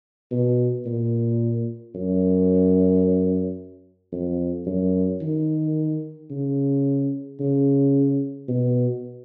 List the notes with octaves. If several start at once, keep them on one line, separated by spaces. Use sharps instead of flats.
B2
A#2
F#2
F2
F#2
D#3
C#3
C#3
B2